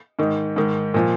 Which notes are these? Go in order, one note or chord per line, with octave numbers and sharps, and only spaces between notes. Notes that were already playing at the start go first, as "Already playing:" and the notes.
G#2 D#3
G#2 D#3
A#2 F3